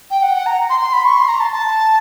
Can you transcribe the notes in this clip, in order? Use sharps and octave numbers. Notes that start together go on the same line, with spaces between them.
G5
F#5
F#5
A#5
C6
C6
B5
C#6
C6
A#5
A5
A5